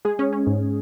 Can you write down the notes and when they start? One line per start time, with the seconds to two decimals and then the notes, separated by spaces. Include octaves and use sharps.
0.05 G#3 G#4
0.19 C#4
0.33 C#4
0.47 G#2